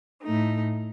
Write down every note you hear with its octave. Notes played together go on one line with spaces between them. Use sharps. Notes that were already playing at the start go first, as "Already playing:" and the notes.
A2 A3 D#4